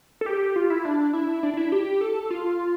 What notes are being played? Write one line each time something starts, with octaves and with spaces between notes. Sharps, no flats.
A4
G4
F4
E4
D4
E4
D4
D4
E4
G4
A4
F4